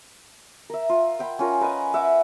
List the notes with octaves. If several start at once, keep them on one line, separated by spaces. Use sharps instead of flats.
A#4 E5
F4
F#5 G5 B5
C#4 F4 A#4
A#4 B4 D#5 G#5
E5 F#5 D6